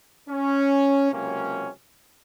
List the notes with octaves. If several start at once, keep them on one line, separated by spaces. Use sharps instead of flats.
C#4
C#2 C3 F#3 A#3 C#4